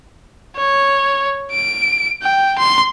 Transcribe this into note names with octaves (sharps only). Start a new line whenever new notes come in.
C#5
D7
G5
C6